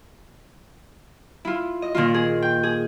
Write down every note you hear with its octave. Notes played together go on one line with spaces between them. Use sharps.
E4 F4
D#5
A#2 D#3 D#4 F4
G#4
G5
G#4